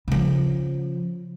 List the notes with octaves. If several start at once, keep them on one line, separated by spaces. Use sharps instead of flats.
C#3 F3